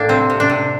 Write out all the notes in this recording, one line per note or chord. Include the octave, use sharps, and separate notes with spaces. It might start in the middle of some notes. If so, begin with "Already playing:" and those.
Already playing: A2 A#3 D4
C3 C4
C3
D4
C3